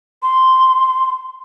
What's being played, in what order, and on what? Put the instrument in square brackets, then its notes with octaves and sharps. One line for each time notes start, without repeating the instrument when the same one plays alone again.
[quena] C6